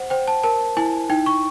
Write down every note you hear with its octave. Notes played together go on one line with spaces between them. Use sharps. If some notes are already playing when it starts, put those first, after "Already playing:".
Already playing: C5 F#5
C5 G5
A5
A#4 A5
E4 G#5
D#4 G5
C#6